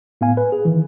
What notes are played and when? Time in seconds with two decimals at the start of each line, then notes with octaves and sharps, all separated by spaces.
0.21 A2 B3 F5 G#5
0.37 B4
0.52 G#4
0.65 D#3 E3